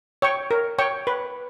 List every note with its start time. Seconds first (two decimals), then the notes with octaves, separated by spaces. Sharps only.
0.22 C#5 G5 C#6
0.51 A#4
0.79 C#5 G5 C#6
1.07 B4